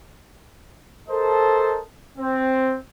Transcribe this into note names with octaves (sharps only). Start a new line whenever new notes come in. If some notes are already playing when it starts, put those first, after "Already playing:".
A4 A#4 C5 D#5 A5
C4